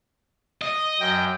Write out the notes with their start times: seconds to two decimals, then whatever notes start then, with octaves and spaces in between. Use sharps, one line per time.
0.61 D#5
1.00 F#2 G5